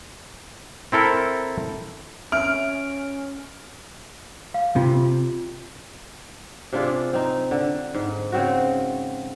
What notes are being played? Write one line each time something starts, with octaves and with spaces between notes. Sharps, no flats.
C4 E4 A4 A#4
C#4 E5 F6 D7
F5
C3 F4
C3 D4 F4 G#4
C4 D#4
D3
G#2
C#3 C4 F#4